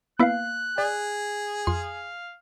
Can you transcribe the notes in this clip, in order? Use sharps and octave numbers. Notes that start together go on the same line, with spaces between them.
A#3 B3 E4 B4 F5 F#6
G#4 D5
F2 F5 C6